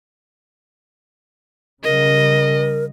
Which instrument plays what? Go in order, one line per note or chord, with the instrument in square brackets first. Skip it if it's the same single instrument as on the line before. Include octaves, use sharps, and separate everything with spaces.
[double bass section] C#3 G3 [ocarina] A#4 [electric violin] D#5